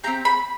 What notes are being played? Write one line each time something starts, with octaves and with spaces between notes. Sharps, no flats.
C4 E4 G4 A#5
B5